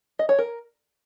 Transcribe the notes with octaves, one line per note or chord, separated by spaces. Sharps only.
D#5
C#5
A#4